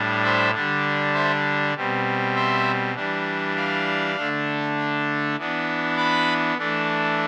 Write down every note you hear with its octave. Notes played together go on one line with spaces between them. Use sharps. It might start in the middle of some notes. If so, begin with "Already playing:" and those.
Already playing: A2 G3 D4
C5 E5
D3 G3 D4
C5 E5
B2 G3 C4
C5 E5
E3 G3 D4
D5 F5
D3 A3 D4
E3 B3 D4
B5 D6
E3 A3 D4